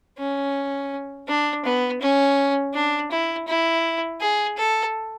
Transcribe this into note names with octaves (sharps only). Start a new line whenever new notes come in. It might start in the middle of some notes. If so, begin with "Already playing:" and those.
C#4
D4
B3
C#4
D4
E4
E4
G#4
A4